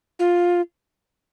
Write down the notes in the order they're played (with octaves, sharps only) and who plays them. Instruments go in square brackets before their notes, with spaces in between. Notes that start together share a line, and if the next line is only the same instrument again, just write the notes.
[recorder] F4